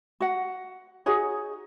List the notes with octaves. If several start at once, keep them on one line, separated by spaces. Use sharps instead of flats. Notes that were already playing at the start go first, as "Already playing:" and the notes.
F#4 F#5
D#4 F#4 G#4 C#5